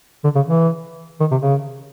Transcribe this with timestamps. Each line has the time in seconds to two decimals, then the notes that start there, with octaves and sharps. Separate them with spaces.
0.24 D3
0.35 C#3
0.46 E3
1.20 D#3
1.31 C3
1.41 C#3